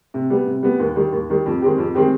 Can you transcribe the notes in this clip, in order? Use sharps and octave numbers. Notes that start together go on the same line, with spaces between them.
C3
G3 B3
C3
G3 B3
D#2
D#3 G3
D#2
D#3 G3
F2
D#3 G#3 C4 G4
F2
D#3 G#3 C4 G4